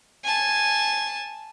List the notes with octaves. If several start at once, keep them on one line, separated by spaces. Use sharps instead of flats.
G#5 A5